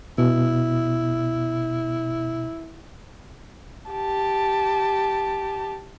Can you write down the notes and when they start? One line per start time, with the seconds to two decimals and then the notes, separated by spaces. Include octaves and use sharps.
0.18 B2 E4
3.91 G4 A5